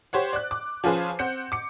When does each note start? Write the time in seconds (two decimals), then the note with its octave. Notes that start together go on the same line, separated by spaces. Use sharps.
0.13 G4 C5 C#5 F#5
0.33 D5 F#6
0.51 D6
0.84 F3 C#4 F4 G#4 B4 C5
1.19 C4 F#5 G6 C#7
1.52 D6 C#7